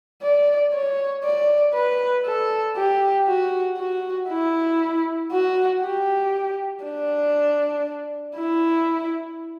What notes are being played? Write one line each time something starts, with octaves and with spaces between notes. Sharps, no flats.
D5
C#5
D5
B4
A4
G4
F#4
F#4
E4
F#4
G4
D4
E4